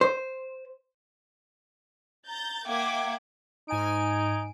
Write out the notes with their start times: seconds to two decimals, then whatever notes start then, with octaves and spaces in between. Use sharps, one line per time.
0.01 C5
2.27 A#5 G6 A6
2.66 A#3 E5 F#5 G5 D6 G#6
3.68 G#2 D#4 G#5 D7